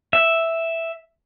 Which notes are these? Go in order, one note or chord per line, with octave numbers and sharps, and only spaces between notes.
E5